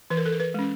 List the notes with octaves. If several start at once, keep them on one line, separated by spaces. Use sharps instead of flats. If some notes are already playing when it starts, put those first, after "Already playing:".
E3 B4
A#4
A4
A#4
B4
G#3 C#4